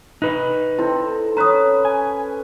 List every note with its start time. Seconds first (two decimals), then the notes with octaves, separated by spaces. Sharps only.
0.22 D#4 B4 F#6
0.79 C4 E4 A4
1.37 C#4 B4 A#5 D#6
1.85 G#5